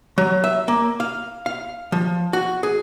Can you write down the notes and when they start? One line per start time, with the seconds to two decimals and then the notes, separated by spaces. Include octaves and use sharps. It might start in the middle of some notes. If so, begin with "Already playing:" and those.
0.18 F#3
0.44 E5
0.68 A#3
1.00 F5
1.46 F5
1.92 F3
2.33 F#4
2.63 G#4